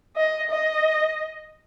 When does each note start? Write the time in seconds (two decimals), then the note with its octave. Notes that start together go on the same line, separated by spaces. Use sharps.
0.16 D#5
0.51 D#5